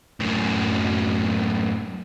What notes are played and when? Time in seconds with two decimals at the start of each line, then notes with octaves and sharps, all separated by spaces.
0.20 F#2 A2